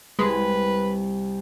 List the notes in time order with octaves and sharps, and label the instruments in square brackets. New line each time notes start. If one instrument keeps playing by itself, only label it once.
[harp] C2 [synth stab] G#3 [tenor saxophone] B4